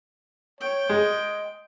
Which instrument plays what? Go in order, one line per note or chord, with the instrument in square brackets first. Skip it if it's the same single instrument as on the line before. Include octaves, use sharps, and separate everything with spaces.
[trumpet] C#5 [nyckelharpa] G5
[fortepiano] G#3 [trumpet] D#5